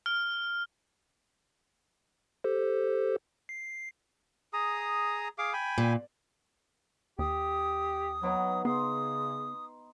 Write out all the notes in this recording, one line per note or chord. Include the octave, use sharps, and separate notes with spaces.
F6
G4 A4 C5
C7
G#4 A#5 D#6
G#4 F5 D6
G5 G#5 B5
A#2
D#2 G4 D#6
F#3 B3 D#4
C#3 B3 C6 D#6